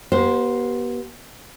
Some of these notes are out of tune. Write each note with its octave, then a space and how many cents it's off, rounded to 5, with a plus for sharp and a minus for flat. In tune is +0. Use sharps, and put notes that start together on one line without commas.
B3 -40 G4 -35 C5 +0